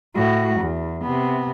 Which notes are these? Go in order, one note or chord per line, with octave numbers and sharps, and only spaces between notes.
A2 F#4
E2
C3 B3